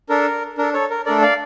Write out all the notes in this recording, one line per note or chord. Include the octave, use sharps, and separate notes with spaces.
D4 A4 A#4
D4 A4 A#4
A4 C#5
A#4
A3 D4 A4 A#4 D5
D5 F5